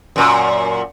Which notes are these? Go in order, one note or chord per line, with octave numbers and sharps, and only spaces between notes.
F#2 A#2